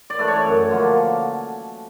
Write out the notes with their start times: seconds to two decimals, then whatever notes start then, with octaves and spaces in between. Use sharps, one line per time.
0.10 D5
0.19 E3 A3 D4
0.28 C#5
0.45 F#2
0.71 D3 F3 A#3